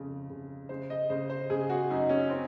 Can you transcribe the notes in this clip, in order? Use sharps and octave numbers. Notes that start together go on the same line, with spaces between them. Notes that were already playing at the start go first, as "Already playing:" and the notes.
Already playing: F2 C#3
C#3
C#3 C5
D#5
C#3 C5
C5
C#3 G#4
F#4
F#2 D#4
C#4
C4